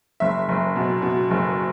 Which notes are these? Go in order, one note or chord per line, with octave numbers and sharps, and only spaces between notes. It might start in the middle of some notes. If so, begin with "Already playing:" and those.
F#1 E5
F#1
B2
B2
F#1